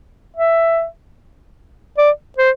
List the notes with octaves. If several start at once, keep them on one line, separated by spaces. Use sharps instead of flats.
E5
D5
C5